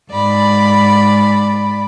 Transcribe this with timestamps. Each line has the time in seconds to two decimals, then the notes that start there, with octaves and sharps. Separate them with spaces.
0.11 G#2 D5 B5